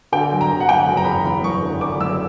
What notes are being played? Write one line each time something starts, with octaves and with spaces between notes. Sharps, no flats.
D3 G5
F#3
A#5
D3
F#5
F#3 G5
F#1
A#5
E2 B5
A#5
E2 B5
F#1 C#6
D3
D3 D6
F#1 E6